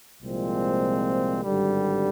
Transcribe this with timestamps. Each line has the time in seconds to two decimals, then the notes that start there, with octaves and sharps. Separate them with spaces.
0.20 C2 A#2 F3 G#3 C4
1.43 G#1 G2 D3 G3